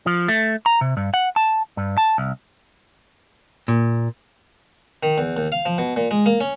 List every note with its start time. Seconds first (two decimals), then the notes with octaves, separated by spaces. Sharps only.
0.06 F3
0.28 A3
0.66 A#5
0.81 C3
0.97 G2
1.14 F#5
1.36 A5
1.77 G2
1.98 A5
2.18 C2
3.68 A#2
5.03 D#3
5.18 E2
5.37 D#2
5.52 F5
5.66 F3
5.78 B2
5.96 A#2
6.11 G#3
6.26 A#3
6.41 C#4